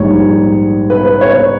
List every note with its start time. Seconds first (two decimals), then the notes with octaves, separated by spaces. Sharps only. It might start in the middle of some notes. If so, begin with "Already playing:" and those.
Already playing: A#1 G#2 G3 C#5
0.90 B4
1.05 B4
1.21 C#5